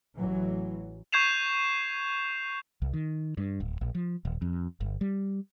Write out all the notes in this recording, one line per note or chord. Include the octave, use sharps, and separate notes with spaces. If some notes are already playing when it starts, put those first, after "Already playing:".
A1 E3 F#3
C#6 G6 G#6 C7 E7 F7
C2
D#3
G2
D1
A#1
F3
D#1
F2
G1
G3